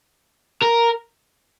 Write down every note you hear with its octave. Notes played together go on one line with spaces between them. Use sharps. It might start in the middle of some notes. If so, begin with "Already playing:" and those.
A#4